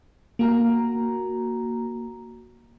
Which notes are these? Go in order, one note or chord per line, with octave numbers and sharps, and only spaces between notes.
A#3 F#4 A#5